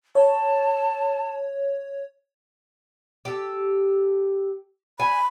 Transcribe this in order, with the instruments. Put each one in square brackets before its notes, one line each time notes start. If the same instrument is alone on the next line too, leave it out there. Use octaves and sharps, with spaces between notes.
[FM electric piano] C#5 [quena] A5
[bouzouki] G4 A4
[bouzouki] G#5 [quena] B5